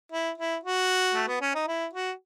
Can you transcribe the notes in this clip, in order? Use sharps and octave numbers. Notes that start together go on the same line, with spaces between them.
E4
E4
F#4
A3
B3
C#4
D#4
E4
F#4